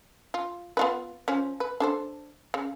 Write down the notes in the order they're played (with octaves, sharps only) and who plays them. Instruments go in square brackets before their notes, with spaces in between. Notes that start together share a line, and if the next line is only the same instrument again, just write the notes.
[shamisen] F4
B3 F4 B4
F3 C#4
B4
D4 A4 C5
C#3